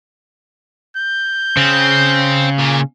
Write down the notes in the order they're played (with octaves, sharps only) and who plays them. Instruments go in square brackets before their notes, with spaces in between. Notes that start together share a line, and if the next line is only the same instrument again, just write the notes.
[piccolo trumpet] G6
[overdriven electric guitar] C#3 [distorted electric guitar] C4
[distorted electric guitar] A#2